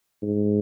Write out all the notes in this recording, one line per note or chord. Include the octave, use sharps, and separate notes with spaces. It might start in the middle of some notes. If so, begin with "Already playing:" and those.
G#2